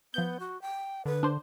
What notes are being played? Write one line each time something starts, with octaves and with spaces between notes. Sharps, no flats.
F3 B3 G6
F#4
G5
D3 B4
D4 C5